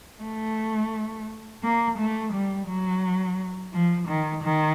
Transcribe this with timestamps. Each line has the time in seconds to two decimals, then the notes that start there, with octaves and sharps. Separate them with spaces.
0.22 A3
1.63 A#3
1.98 A3
2.33 G3
2.68 F#3
3.73 F3
4.08 D#3
4.43 D#3